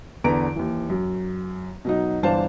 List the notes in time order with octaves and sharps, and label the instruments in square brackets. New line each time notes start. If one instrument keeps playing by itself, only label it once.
[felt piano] E2 D3 B4 A#5 D7
D#2 E3
F#2
B2 F#3 D#4
G1 E3 D4 C5 F5 A5